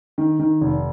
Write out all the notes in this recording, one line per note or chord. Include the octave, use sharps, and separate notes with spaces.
D#3
D#3
F1